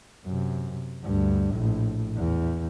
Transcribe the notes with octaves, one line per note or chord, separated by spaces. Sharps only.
F#2 C3
D2 G2
A#1 A2
E2